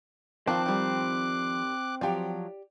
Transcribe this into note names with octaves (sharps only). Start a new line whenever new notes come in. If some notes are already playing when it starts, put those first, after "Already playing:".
D#3 F3 C4 D5 G5 A5 D6 F#6
D#3 G3
F3 F#3 G4 D5